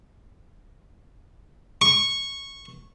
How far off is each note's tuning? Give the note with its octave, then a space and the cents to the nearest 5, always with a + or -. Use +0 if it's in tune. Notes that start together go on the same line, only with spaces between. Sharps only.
C#6 -10